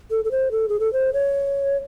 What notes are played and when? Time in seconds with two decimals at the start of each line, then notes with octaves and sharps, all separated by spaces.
0.11 A4
0.25 A4
0.31 C5
0.51 A4
0.69 G#4
0.80 A4
0.93 C5
1.13 C#5